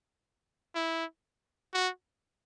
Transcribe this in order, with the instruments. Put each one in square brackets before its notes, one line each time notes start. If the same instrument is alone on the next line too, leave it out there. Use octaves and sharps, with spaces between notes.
[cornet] E4
F#4